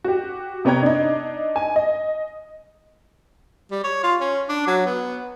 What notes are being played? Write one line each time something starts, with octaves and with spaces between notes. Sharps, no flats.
F#4 G4
C3 B3 C#5 G5 A#5 G#6
D4 D#4
G#5
D#5
G3
C#5
F4
C#4
D4
F#3
B3